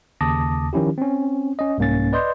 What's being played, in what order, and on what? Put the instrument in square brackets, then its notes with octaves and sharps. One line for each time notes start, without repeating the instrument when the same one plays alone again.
[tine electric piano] D#2 C#3 A5 D6 D#6 A#6
D#3 F3 C#4 E4 G4
C4 C#4
C#4 D#5
C2 G#2 A#3 C#4 A6
B4 D5 D#5 C6 G6